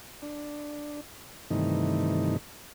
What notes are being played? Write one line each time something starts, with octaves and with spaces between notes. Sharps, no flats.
D4
G2 C3 D#3 E3 A3 D#4